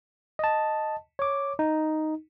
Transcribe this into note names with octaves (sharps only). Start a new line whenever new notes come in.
D#5 A5
C#5 D6
D#4